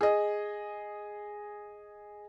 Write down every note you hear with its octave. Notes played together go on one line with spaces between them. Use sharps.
G#4 D#5